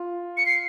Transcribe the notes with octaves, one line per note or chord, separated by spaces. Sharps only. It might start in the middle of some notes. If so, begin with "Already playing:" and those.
Already playing: F4
C#7
C7